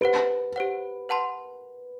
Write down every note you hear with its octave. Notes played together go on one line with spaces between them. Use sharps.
G4 B4 C5 F#5
G4 C5 F#5
B4 F#5 A5 C6